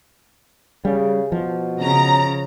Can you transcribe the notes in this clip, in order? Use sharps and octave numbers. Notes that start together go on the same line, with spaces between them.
C#3 G3
B2 F3
C#3 A#5